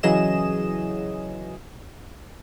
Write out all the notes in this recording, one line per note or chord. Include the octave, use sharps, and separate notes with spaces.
C#3 E3 F#3 G#4 D#5 E7